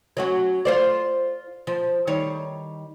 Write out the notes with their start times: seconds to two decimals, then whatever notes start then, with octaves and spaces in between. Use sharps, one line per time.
0.17 F#3 C#4 F#4
0.65 F4 C5 D5
1.67 F3
2.07 D#3 G3 C#5